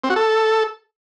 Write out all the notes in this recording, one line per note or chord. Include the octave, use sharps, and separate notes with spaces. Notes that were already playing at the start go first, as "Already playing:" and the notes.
C4
F#4
A4